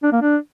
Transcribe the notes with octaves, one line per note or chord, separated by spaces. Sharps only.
D4
A#3
D4